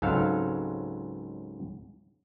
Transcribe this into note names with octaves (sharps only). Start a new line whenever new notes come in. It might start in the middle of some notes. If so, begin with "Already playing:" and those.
C#2 G#2 F#3 C4 A4 F5